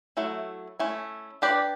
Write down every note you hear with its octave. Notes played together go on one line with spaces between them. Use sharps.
F#3 A3 E4
A3 C#4 E4
D4 G4 B4 D5